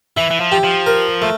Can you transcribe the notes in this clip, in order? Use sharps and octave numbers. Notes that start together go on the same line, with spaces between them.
E3 E4
E3
F3
G4
F3
A#4
A3